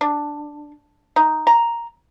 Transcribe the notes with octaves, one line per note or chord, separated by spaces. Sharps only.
D4
D#4
A#5